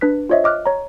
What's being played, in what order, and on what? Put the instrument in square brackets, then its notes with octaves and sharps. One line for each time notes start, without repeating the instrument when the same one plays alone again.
[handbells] D4 B4 F#6 B6
F4 C5 C#5 D#5 E5
D#5 D6 F6 F#6
C#5 A#5